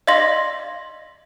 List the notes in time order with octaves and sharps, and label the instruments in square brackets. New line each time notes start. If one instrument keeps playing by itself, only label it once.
[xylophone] D5 D#5 F5 C6 A#6